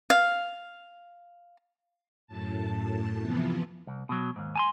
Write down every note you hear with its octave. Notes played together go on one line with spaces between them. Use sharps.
F5
F#2 A2 A5
C3 E3 F3 B3
C2
B2 F#3
D#2 G#2
G#5 A5 C6